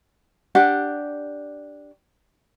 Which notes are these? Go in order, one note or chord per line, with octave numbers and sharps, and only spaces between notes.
D4 G4 F#5